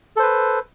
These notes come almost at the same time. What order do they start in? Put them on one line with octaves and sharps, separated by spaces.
A4 C5 B4